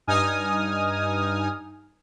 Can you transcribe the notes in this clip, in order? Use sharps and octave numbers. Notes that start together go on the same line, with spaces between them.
G2 D#4 G#5 D#6 F6